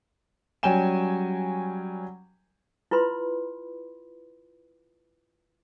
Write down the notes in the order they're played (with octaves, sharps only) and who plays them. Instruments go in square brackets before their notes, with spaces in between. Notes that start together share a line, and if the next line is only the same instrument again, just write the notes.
[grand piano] F#3 G3 C#4 G5 G#5 E7
[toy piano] E4 F4 B4 B5 C6